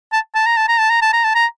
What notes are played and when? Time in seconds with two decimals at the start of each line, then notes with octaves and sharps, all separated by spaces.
0.12 A5
0.35 A5
0.46 A#5
0.57 A5
0.68 A#5
0.79 A5
0.90 A#5
1.02 A5
1.13 A#5
1.24 A5
1.35 A#5